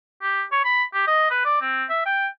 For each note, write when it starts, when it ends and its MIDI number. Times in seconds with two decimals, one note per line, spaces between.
0.22 0.44 67
0.52 0.65 73
0.65 0.83 83
0.94 1.03 67
1.07 1.28 75
1.31 1.42 71
1.45 1.60 74
1.62 1.84 60
1.90 2.02 76
2.06 2.27 79